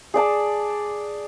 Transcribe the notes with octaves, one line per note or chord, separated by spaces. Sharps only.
G#4 D5 A5